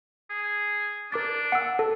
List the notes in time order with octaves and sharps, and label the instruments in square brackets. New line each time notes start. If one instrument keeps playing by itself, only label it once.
[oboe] G#4
[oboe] D4 [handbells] A#4 D6 A6
[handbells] F#5 E6
A4